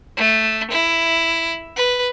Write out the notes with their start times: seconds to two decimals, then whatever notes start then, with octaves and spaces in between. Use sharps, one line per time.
0.17 A3
0.71 E4
1.76 B4